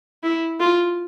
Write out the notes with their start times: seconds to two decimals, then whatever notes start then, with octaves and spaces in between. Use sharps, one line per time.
0.23 E4
0.60 F4